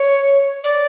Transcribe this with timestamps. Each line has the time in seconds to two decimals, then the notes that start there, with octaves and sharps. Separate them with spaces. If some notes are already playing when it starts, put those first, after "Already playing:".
Already playing: C#5
0.64 D5